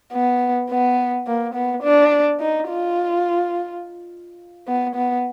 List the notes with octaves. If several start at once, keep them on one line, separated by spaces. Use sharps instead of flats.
B3
B3
A#3
B3
D4
D#4
F4
B3
B3